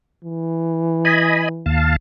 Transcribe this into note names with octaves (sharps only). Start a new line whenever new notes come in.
E3
D#5 G#5 B5
D#2 F5 A5